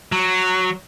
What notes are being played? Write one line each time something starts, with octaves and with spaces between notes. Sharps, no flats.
F#3